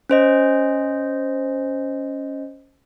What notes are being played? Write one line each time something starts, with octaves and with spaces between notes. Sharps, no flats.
C#4 C5 D#5